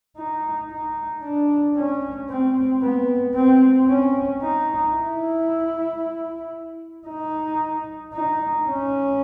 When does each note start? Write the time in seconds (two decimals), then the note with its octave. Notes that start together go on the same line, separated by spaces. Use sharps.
0.17 D#4
0.70 D#4
1.23 D4
1.76 C#4
2.29 C4
2.82 B3
3.35 C4
3.89 C#4
4.42 D#4
4.95 E4
7.07 D#4
8.13 D#4
8.67 C#4